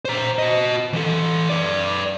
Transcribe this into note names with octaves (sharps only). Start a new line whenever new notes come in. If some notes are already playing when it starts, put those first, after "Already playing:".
C5 A#5
F#4 D#5
E3 A4
B4 D5